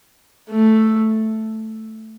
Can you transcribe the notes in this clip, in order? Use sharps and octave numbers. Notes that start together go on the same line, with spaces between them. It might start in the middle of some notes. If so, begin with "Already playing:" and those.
A3